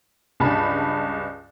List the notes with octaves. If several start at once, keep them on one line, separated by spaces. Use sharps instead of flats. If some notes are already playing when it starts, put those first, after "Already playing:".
C#2 G2 A5 B5